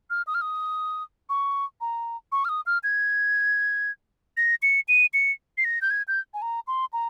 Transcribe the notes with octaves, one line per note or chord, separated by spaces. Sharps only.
F6
D#6
F6
D#6
C#6
A#5
C#6
F6
D#6
F6
G#6
A#6
C#7
D#7
C#7
C7
A#6
G6
G#6
G6
G#5
A#5
C6
A#5